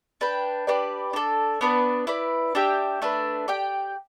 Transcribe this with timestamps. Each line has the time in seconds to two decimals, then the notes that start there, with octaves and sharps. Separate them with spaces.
0.21 D4 B4 G5
0.67 D4 G4 B4 D5
1.13 D4 A4 D5
1.61 B3 D4 B4 D5
2.07 E4 B4 D5
2.55 D4 G4 E5 G5
3.02 A3 D4 B4
3.48 G4 D5 G5